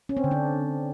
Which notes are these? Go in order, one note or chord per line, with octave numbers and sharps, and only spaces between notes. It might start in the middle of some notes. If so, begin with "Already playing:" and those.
C#4
C4
D3
D4